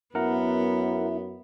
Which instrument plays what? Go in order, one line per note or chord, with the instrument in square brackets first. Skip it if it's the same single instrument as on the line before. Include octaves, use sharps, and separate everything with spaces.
[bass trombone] F#2 [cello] B3 [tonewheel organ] E4 [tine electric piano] A#4 F#5 A#5